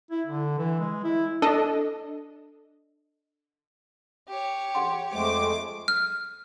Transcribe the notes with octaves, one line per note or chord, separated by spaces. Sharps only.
E4
D3
E3
G#3
E4
D4 A4 D#5
G4 C#5
G#4 F#5 C6
F2 G#3 A3 C5 D6
F6